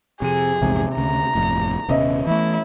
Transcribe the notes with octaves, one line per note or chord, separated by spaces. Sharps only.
F2 C3 G#4 D#7
A#1 E2 G#2 C3
D2 C#3 A#5
G1 F2 A2
D#1 C3 B3 C#4 D#5 E5
E3 A3 E4